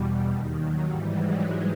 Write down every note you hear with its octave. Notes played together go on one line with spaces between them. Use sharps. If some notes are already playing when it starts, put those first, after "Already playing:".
Already playing: E2 B2 G3
D#2 D#3
F#3
G#2 E3 G3
F#3 G#3